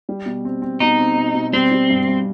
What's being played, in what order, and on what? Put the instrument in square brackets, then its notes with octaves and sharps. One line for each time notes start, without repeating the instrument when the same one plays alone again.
[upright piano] G3
B2
C4
C4
[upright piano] B2 [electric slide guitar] D#4
[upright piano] C4
B2
B2
[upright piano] G3 [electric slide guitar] C4
[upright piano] G3
G2
G2